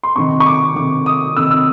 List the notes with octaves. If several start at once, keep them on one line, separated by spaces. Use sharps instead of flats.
C6
C3 D#3 C#6
C#6
D6
C3 D#3 D6
D#6
C3 D#3 E6
E6